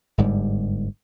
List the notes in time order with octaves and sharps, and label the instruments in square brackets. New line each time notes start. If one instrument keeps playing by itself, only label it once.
[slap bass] G1 G#2 G3